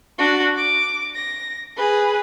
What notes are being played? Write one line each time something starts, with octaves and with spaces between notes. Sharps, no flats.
D4 F#4
D6
A#6
G#4 B4